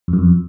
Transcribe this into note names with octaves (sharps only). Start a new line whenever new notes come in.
F2
F#2
F2